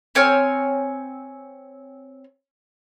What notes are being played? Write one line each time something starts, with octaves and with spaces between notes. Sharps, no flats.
C4 C#5 G#5 F6